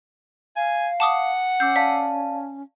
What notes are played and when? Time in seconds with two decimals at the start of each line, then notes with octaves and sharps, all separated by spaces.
0.56 F5 G#5
1.00 F#5 A5 D6 D#6
1.60 C#4 D6 E6 G6 C7
1.76 D5 F5 A5 B6